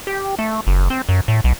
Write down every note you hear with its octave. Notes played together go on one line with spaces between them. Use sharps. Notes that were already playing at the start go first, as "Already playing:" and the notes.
G4
A3
F#1
C4
F#2
A2
B1